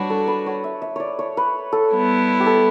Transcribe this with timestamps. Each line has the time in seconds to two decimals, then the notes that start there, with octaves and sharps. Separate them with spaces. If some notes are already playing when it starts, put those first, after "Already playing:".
Already playing: G3 D4 F#4 B4 C#5
0.10 A4
0.27 B4
0.46 C#5
0.64 E5
0.82 E5
0.96 C#5 D5
1.19 C#5
1.37 B4
1.73 A4
1.92 G3 B3 E4
2.40 G4
2.47 A4